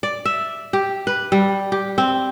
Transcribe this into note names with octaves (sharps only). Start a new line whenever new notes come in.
D5
E5
G4
B4
G3
G4
C4